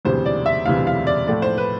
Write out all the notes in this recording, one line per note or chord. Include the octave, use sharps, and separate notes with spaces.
E1 D2 C3 E3 G3 C5
D5
E5
E1 D2 C3 E3 G3 F5
F5
D5
A2 F3 A3 D5
C5
B4